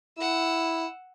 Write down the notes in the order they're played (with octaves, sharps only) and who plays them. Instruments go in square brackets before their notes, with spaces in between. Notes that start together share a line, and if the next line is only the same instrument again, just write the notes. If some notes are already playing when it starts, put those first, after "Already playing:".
[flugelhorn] E4 [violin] F#5 E6